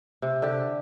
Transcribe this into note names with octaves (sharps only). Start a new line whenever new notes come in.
C3
D3 G4